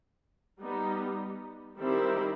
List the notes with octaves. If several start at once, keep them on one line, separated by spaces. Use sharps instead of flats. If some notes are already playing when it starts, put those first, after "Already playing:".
G3 B3 D#4
D#3 G3 C4 E4 G4